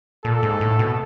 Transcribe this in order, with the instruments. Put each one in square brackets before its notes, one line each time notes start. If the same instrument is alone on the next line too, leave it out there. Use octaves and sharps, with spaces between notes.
[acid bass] A#2 [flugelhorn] A4
[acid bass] G#2
A2
B2